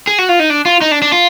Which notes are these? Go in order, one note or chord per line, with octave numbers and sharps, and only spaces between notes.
G#4
F#4
F4
D#4
D4
F4
D#4
D4
D4
F4